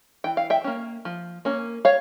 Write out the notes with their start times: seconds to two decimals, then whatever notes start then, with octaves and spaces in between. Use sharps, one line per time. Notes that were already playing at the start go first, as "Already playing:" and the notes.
0.24 E3 G5
0.37 F5
0.50 E5 G5
0.64 A#3 C#4
1.05 F3
1.45 A#3 C#4
1.85 C#5 F5